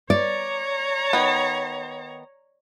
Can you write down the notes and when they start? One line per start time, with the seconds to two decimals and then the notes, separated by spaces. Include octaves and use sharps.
0.10 C#5 D5 A#5
1.13 D#3 B3